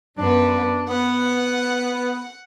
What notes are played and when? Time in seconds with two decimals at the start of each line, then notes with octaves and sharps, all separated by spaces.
0.17 F#2 B3 D4
0.89 B3 F#5